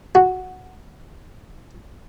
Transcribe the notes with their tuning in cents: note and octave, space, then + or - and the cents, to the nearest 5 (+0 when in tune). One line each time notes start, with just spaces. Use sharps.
F#4 -5